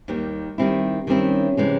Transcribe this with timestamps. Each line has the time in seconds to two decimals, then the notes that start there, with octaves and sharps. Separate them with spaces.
0.08 D#2 D#3 G3 A#3
0.58 D#3 G3 C4 E4
1.07 D#3 G3 C4 C#4 E4
1.57 C3 E3 G#3